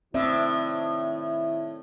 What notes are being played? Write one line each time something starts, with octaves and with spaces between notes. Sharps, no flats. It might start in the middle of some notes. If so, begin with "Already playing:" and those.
A2 D#3 C4 E4 D5 E5